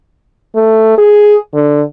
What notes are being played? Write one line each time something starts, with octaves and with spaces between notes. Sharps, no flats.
A3
G#4
D3